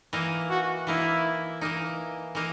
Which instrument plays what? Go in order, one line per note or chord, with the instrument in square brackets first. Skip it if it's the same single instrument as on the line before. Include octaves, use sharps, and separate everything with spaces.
[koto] E3 A#3 D#4
[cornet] F#4
[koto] E3 A#3 D#4 [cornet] E4
[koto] E3 A#3 D#4
E3 A#3 D#4